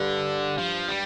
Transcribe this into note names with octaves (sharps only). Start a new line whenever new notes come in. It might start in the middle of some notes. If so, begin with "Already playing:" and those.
Already playing: G2 D3
F3
G3